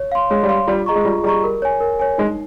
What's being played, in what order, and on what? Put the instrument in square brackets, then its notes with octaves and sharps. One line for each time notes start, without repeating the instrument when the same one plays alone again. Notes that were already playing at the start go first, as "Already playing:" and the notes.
Already playing: [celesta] C#5
F5 C6
[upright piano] G#3 [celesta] C#5
[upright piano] G3
[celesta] F5 C6
[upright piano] G3 [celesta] F4
[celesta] G#4 D#5 A#5 C#6
[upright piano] G#3
[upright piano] G3 [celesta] F4
[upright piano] G3 [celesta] G#4 D#5 A#5 C#6
[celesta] A#4
C#5 G#5
A#4
C#5 G#5
[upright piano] G#3 [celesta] D#4